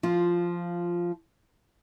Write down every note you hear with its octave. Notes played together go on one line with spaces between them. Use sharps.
F3 F4